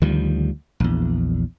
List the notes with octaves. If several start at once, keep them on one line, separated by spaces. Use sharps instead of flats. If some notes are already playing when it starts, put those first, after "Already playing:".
D2 D#3 F3 G3
A#1 E2